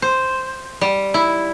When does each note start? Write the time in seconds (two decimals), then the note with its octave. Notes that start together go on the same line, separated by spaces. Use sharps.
0.02 C5
0.81 G3
1.14 E4